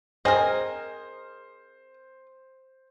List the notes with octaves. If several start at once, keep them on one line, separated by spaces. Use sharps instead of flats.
C4 G#4 A#4 C5 D#5